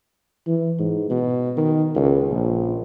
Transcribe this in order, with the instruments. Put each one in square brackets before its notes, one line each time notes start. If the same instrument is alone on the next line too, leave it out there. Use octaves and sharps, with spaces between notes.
[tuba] E3
G#2
B2
D#3
C#2
A#1